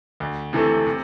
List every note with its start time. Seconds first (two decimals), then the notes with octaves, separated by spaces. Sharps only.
0.20 D2
0.53 C3 E3 A3
0.86 C3